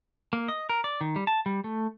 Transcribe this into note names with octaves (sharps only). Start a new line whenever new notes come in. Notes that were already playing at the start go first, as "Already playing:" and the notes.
A#3
D#5
A#4
D5
D#3
G3
A5
G3
A3